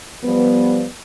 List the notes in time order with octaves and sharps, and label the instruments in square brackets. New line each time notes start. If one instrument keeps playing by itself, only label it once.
[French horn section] F3 G3 B3